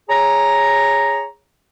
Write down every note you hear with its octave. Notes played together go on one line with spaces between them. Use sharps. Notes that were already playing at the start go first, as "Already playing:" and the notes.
G#4 C#5 A#5